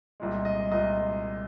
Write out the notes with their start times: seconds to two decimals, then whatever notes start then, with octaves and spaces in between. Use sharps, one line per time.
0.20 C2 A#2 G#3
0.45 D#5
0.72 C2 A#2 G#3 D#5